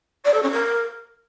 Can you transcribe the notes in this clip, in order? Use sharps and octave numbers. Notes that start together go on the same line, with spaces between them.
D5
A4
C#4
A#4